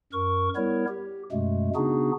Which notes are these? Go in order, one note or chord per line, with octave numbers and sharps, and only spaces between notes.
F#2 A#4 C#6
G3 B3 E4 A#4 C#5
G4
F#2 B2 G#3 A3
C#3 B3 D4 D#4 F#4 G#4